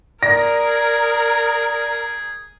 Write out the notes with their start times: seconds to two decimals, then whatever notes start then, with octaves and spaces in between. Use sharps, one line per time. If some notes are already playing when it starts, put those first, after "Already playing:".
0.23 G#4 A#4 D5 A#6